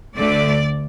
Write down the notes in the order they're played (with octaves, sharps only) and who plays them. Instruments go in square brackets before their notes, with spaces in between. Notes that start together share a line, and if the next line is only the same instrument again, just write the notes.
[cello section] D2 D3 A3 D5